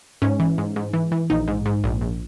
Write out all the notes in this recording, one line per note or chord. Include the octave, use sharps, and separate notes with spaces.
G#2 C#4
E3
G#2
G#2
E3
E3
A#1 D#4
G#2
G#2
A#1
A#1